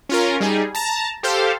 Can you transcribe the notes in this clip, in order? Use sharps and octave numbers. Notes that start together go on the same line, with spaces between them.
C#4 F4 A#4
G3 D#4 G#4
A5 A#5
G4 A4 C5 F5